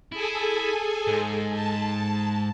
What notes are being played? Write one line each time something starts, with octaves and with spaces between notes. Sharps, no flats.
E4 G#4 A4 G#5
G#2
A5